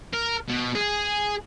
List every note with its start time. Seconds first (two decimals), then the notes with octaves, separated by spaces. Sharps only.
0.13 A#4
0.48 B2
0.75 G#4